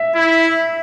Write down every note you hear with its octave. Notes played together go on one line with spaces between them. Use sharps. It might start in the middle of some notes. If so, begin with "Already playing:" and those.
Already playing: E5
E4